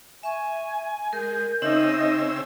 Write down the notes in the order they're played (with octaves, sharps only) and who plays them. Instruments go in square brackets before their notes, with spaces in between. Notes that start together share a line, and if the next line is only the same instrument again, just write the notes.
[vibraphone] E5 C#6 [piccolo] G#5
[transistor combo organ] G#3 [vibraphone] A#4 [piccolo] G6
[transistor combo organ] C#3 C4 E6 [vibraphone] D#4 E5 [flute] D#5